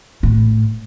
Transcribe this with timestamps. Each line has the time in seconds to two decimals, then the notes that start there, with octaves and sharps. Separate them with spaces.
0.23 A2